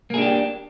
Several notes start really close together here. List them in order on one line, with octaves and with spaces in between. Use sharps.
A#3 G#4 D4 G4